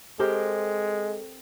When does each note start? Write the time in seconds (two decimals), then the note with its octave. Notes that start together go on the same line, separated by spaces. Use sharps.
0.19 G#3 C4 G4 A4 A#4